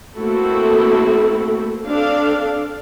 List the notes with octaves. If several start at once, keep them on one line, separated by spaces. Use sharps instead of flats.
A3 A#3 C4 E4 F#4 A4
C4 D4 A4 F5